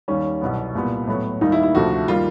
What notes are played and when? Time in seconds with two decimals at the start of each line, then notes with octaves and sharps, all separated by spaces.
0.08 D#2 D#3 G3 C#4
0.41 C2 B2 F#3 B3
0.75 C2 A#2 G3 B3
1.07 A2 F#3 B3
1.41 D#2 D#3 G3 A#3 D#4
1.52 E4
1.63 E4
1.75 D2 C3 F3 A3 F#4
2.08 D#3 G3 A#3 F4